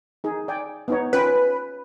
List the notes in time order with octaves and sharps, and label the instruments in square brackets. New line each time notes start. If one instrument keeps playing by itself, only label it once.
[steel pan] D#4 G#4
D5 G5 G#5
B3 D#4 C#5
[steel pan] C#4 F4 G5 [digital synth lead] B4